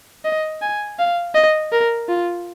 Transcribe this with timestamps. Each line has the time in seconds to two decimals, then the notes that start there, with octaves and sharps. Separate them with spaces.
0.25 D#5
0.62 G#5
0.99 F5
1.35 D#5
1.72 A#4
2.09 F4